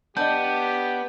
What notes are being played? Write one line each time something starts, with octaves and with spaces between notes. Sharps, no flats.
B3 D4 G4 D#5 G6